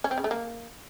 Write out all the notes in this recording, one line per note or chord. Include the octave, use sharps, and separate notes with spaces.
C#4
C4
C#3
A3
A#3